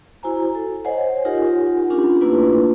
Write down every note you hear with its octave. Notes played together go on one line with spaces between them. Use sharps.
E4 F#4 C5 G#5 A#5
A4
C5 C#5 D#5 F#5 G#5
D#4 F4 G4 A#4 F#5 G#5
C#4 D4 F4 G4
A3 A#3 D4 E4 F4 B4